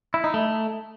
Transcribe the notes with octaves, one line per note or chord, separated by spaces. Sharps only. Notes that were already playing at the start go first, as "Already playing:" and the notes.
E4
D#4
A3